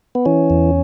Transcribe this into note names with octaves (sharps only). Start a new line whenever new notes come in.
B3
E3 C#4
E2